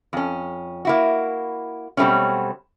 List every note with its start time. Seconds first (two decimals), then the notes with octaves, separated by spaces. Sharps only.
0.13 F2 C#4
0.85 A#3 E4 F#4
1.97 B2 F#3 G3 A3 C4 C#4